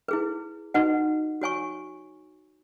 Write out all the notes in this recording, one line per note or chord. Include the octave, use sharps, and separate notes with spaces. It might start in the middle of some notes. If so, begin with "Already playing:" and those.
E4 G#4 B4
D#4 F#4 B4 D#5 F#5
F#4 C#5 G#5 C#6